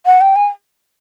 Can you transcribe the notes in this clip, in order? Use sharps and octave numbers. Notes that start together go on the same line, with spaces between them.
F#5
G5
G#5